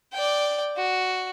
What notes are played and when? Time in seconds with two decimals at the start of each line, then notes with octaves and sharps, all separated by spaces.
0.13 D5 G5
0.77 F#4